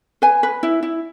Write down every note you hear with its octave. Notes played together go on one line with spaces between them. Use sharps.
B4 G#5
B4
E4
E4